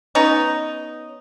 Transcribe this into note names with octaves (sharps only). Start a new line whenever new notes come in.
B3 C#4 D#4